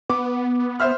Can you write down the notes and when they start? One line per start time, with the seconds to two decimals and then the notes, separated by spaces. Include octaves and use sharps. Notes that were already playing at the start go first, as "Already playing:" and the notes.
0.10 B3 D6
0.80 C5 E5 F6